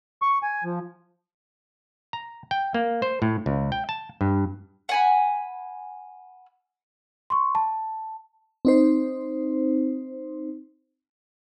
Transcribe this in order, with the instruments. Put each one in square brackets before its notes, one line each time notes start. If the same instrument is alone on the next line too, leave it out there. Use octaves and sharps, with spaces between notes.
[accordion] C#6
G#5
F3
[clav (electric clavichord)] A#5
G5
A#3
C5
A2
C#2
G5
A5
G2
[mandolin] F#5 G#5 B5
[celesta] C6 C#6
A5
[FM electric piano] C4 D#4 C5